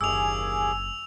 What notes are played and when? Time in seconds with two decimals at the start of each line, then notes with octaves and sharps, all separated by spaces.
0.01 F#1 D#2 D3 G#4 G#5 D6 E6 F7